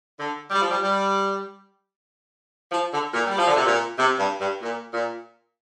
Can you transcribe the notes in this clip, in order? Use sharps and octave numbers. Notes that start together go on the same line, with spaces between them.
D3
G3
F3
G3
G3
F3
D3
A#2
G3
F3
D3
C3
A#2
C3
G2
G2
A#2
A#2